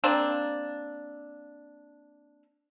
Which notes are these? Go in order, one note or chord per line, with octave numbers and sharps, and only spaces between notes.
A#3 C4 D4